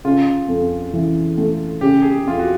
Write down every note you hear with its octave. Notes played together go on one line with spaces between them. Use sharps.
C#3 F4
F2
E3
A3
C#3 G4
G#4
G4
F2 F4
F#4